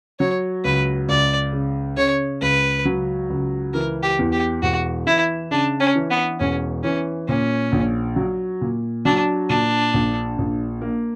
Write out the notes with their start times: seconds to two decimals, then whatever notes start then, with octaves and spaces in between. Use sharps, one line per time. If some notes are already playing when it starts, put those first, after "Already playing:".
0.19 F#3 C#5
0.65 C#2 B4
1.08 C#2 D5
1.52 C#3
1.97 C#3 C#5
2.41 C#2 B4
2.85 F#3
3.30 C#2
3.73 E3 A#4
4.03 G4
4.19 E2
4.32 G4
4.62 E1 F#4
5.06 E3 E4
5.51 C#3 D4
5.80 C#4
5.95 E3
6.10 B3
6.40 E1 C#4
6.83 E3 C#4
7.28 A#2 C#4
7.72 A#1
8.16 F#3
8.61 A#2
9.05 F#3 D4
9.49 A#2 D4
9.94 A#1
10.38 A#1
10.81 A#3